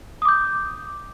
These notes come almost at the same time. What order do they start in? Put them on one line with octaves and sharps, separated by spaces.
D#6 D6 G6